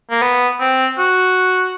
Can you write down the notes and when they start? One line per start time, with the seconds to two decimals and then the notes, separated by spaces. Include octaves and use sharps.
0.11 A#3
0.21 B3
0.60 C4
0.98 F#4